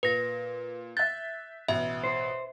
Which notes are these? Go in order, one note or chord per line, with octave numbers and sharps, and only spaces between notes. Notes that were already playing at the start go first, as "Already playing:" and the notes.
A#2 B4 A#6
E5 F#6 G6 A6
A1 B2 E5
C5